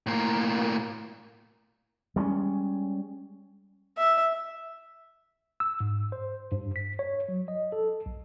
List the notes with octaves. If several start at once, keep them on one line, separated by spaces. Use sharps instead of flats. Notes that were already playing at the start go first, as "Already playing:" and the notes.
A2 A#3
G3 G#3 C4 C#4
E5
E6
G#2
C5
G2
B6
C#5
F#3
D#5
A4
B1